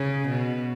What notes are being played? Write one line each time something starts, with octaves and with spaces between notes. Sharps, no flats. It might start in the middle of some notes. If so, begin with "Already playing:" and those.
Already playing: C#3
B2